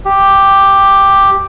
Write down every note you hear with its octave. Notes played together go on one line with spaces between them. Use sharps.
G4